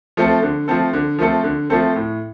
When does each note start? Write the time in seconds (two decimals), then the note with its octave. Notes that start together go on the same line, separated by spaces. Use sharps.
0.17 F3 A3 C4 A4
0.42 D3
0.68 F3 A3 C4 A4
0.93 D3
1.19 F3 A3 C4 A4
1.44 D3
1.70 F3 A3 C4 A4
1.96 A2